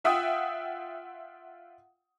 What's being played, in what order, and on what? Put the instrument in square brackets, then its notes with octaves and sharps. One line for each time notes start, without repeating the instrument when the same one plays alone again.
[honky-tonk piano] F4 E5 F#5 G5 D#6